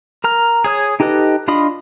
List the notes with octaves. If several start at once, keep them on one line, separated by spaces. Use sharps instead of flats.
A#4 A#5 F6
G#4 C#5 D#6
D#4 G4 A4 B4 D#5
D4 F4 D#5 B5 D#6